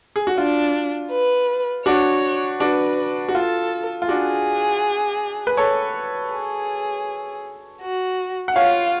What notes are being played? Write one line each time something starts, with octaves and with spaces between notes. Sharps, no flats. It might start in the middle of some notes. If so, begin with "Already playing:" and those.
G#4
F#4
D4 F4
B4
D4 F#4 C#5
D4 F#4 B4
F#4
F4 A4
F4
D4 F#4 G#4
B4
A4 C#5
G#4
F#4
F#5
F4 C#5 F5